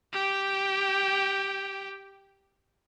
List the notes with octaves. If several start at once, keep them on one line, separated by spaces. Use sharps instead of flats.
G4 G5